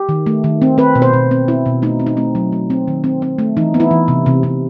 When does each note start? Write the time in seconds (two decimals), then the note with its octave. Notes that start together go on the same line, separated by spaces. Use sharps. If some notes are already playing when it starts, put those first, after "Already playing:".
Already playing: G4
0.09 D#3
0.26 A3
0.44 D#3
0.62 C4
0.78 C4 B4
0.95 B2
1.02 C5
1.13 B2
1.31 C4
1.48 C4 E4
1.66 B2
1.82 A3 D#4
2.00 C4
2.07 D#4
2.17 A3 C4
2.35 F#3
2.52 A3
2.70 C4
2.88 D#3
3.04 C4
3.22 C4
3.39 A3
3.57 E3 D#4
3.74 B3
3.80 E4
3.91 E3
4.08 C3
4.26 C3
4.43 C3